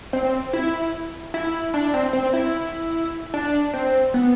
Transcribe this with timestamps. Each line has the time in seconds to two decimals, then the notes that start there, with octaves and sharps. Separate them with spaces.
0.13 C4
0.53 E4
1.34 E4
1.74 D4
1.94 C4
2.13 C4
2.33 E4
3.34 D4
3.74 C4
4.14 B3